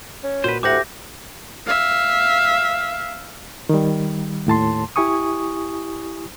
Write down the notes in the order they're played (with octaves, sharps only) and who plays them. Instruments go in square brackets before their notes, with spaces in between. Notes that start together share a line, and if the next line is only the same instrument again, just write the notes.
[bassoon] C#4
[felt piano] A#2 F#4 [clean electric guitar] B4 C5
[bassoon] D2 [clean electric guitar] A2 F#5 [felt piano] G4 E5 [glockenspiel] D6 G6 A#6
[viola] E5 F5
[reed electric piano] D#3 G3
D#2 A2 A5 C6
E4 G4 G#5 C#6 D#6